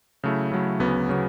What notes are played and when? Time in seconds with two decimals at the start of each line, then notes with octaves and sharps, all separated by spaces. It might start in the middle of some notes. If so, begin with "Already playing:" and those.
0.24 C#3 F#3 A3 E4
0.52 C#3 F#3 A3 E4
0.80 D2 C#3 F#3 B3
1.09 C#3 F#3 B3